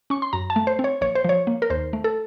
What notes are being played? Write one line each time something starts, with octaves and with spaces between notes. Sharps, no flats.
C#4 C#6
C6
F#2 A#5
A5
A3
C5
C4
C#5
A#1 C#5
C5
F3 C#5
A#3
A#4
D#2 C5
A3
A4